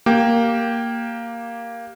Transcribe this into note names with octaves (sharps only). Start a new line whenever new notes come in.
A#3 G4 G5